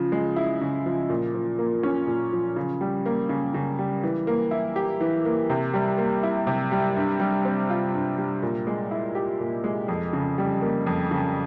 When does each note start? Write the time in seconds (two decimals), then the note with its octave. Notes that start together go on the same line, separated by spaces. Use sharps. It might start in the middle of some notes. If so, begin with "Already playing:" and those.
Already playing: C#3 F3
0.12 G#3
0.36 E4
0.61 C#3
0.86 F3
1.09 A#2
1.34 F3
1.59 A#3
1.83 C#4
2.07 A#2
2.33 F3
2.56 C#3
2.81 G3
3.06 A#3
3.29 C#3
3.54 C#3
3.79 G3
4.03 E3
4.27 A#3
4.51 E4
4.76 G4
5.01 E3
5.25 A#3
5.50 C3
5.74 G3
5.98 A#3
6.23 E4
6.47 C3
6.72 G3
6.96 G2
7.20 G3
7.45 C4
7.70 F4
7.94 G2
8.18 G3
8.42 A#2
8.67 G#3
8.91 E4
9.15 G4
9.40 A#2
9.64 G#3
9.88 F2
10.13 C#3
10.38 G3
10.62 A#3
10.87 F2
11.11 C#3